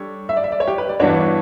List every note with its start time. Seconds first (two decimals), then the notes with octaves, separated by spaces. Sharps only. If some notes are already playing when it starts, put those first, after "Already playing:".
Already playing: G3 D4 A4 C#5
0.29 E5
0.37 D5
0.44 E5
0.52 D5
0.60 C#5
0.67 G4
0.78 B4
0.89 D5
0.99 G2 E3 B3 D4 F#4 C#5